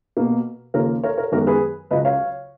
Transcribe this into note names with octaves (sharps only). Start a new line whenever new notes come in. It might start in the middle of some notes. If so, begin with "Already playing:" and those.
B2 A#3
D#2 C#3 F3 A#3 A#4 C#5
A#4 C#5
A#4 C#5
F#2 D#3 G#3 B3 F#4 A#4
G#4 B4
C#2 C#3 F#3 B4 D#5
C#5 F5